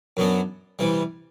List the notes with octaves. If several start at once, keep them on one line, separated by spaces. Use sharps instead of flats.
F#2 F#3 B3 D4
C3 E3 G3